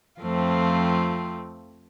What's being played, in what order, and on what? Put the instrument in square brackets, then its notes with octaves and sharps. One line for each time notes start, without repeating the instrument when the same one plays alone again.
[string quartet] F2 F3 A3 C4 F4